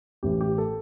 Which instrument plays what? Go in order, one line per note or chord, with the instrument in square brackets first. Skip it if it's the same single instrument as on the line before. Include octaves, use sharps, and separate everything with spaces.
[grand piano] A1 A2 E3 G4
G4
A4